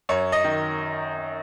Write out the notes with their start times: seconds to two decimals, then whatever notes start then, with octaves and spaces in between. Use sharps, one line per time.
0.09 F#2 C#5
0.32 D#5
0.44 D#3